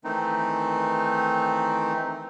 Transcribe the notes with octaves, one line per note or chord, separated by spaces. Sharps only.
D#3 E3 A3 C4 D#4